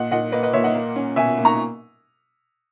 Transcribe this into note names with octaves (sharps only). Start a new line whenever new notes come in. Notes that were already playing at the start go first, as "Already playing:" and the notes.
Already playing: A#2 D#5 F#5
A#2 D#5 F#5
A#3 B4 D#5
B4 D#5
A#2 C#5 E5
D#5 F#5
A#3
C#4
B2 E5 G#5
A#3
A#5 C#6